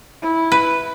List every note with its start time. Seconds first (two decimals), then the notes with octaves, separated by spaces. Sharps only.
0.22 E4
0.52 B4